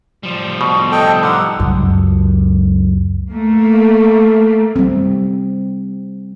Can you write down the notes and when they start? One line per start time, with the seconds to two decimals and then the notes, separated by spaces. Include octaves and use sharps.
0.23 F3 G3
0.61 B2
0.92 A4 D#5 G5
1.23 D3 D#3 F#5
1.60 C#2 F#2
3.30 A3 A#3
4.76 G3 C4